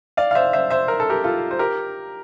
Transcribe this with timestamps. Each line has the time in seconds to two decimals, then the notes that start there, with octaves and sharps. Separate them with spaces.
0.17 D5 F5
0.31 F5
0.35 C5 E5
0.53 C5 E5
0.70 C5 E5
0.88 A#4
1.00 A4
1.09 G4 A#4
1.24 F4 A4
1.51 C5
1.59 G4 A#4